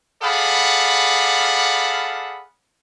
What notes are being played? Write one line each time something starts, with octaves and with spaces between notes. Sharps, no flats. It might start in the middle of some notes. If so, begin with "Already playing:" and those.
G#4 A4 D5 F5 F#5 B5